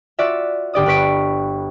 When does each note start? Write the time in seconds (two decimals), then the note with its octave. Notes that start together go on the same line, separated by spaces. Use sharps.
0.19 F4 F#4 D5 E5
0.74 G1 G4 D5 D#6
0.86 G1 B4 C#6 B6 D7